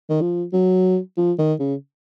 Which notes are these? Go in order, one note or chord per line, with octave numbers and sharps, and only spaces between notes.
D#3
F3
F#3
F3
D#3
C#3